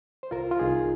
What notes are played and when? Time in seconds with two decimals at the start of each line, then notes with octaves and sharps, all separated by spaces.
0.23 C5
0.31 C2 F4 A#4
0.51 F4
0.59 C2 D#4 G#4